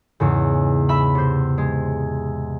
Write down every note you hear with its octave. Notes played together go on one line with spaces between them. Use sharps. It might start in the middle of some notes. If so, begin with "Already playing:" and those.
E2 G#2 C#3
E5 B5
C3 C5
G#3